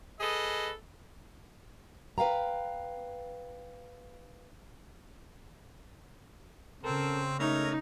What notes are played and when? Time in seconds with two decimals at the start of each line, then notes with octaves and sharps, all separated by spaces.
0.20 G#4 A4 B4 D#5
2.18 B4 F5 G5 A#5
6.84 C#3 C4 A4 A#4
7.40 G#3 A3 D#4 A#4 C#5